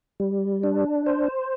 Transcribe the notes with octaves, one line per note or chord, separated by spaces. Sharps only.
G3
D4
C5